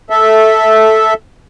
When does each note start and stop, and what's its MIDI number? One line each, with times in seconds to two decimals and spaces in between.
0.10 1.14 69
0.10 1.14 76